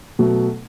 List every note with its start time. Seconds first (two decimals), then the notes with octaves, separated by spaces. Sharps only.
0.19 B2 F#3 A3